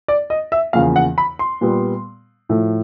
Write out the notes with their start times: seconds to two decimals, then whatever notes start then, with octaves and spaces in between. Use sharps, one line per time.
0.08 D5
0.30 D#5
0.52 E5
0.73 E2 C#3 F3 A#3 F5
0.96 F#5
1.18 B5
1.39 C6
1.61 A#2 G3 B3
2.49 A2 F3 A3